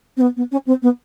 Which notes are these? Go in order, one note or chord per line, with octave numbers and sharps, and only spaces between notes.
C4
B3
B3
C#4
C4
B3